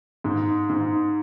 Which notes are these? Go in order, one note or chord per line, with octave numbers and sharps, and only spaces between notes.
G#2
G#2